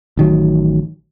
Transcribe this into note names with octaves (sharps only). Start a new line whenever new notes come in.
A1 D#3 F#3